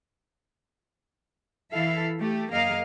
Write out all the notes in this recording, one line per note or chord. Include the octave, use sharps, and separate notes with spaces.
E3 E4 A4 E5 F5
A3 G4
F#2 A#3 G#4 A#4 D#5 F5